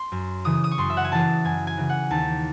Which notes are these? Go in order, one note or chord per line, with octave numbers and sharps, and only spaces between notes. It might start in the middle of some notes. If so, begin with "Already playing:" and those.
Already playing: C6
F#2
C#3 E3 D#6
D#6
C#6
F#2 C6
E5
F#5
G#5
C#3 E3 A5
F#2 G#5
G#5
C#3 E3
F#5
D#2 A5